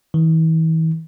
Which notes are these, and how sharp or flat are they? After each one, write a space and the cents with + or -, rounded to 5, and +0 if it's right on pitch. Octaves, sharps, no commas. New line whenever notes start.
E3 -40